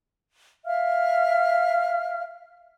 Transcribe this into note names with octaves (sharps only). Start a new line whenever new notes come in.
E5 F5 F6